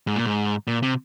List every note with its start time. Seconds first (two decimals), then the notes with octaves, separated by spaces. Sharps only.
0.07 G#2
0.16 A#2
0.26 G#2
0.67 A#2
0.82 C3